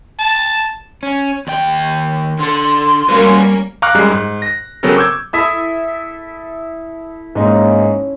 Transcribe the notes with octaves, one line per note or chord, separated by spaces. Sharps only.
A5
C#4
D#2 G5
D3 A4 C6
G3 A#3 C#4 F#4 B4
F5 A#5 C#6 D6 F6 F#6
F#2 G3 G#3 F#6
G#2
A#6
C#3 F#3 B3 C4 A4 A#4
C#6 D6 E6 G6 G#6
E4 A4 E5 D#6 B6
G#2 A#3 C#4 D#4